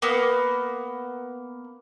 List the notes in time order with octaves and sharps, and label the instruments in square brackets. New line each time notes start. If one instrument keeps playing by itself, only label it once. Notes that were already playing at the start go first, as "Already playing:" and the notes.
[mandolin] A#3 B3